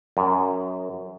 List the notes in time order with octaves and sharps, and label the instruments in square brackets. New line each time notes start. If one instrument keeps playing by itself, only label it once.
[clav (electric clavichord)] F#2